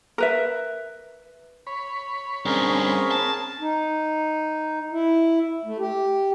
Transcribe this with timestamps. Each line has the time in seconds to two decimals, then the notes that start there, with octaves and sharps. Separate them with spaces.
0.18 A#4 B4 E5
1.67 C#5 B5
2.45 D2 G2 C4 C#4 G#4 A#4
3.11 A5
3.60 D#4
4.92 E4
5.65 A3
5.79 G4